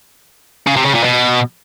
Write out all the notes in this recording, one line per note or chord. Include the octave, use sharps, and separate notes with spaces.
C#3
C3
C#3
A#2
B2